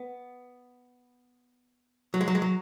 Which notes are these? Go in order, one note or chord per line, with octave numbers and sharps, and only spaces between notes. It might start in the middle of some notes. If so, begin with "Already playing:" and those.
Already playing: B3
F#3
G#3
F#3
G#3
F#3